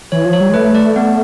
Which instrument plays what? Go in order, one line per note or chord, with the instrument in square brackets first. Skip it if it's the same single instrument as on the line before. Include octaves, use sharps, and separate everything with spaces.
[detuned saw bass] E3 [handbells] C#5
[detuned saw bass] F3
[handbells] C#5
[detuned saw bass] G3
G#3
[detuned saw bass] A3 [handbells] B4
[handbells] D5
B3